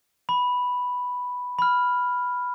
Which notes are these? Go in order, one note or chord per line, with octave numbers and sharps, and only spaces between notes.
B5
B5 F6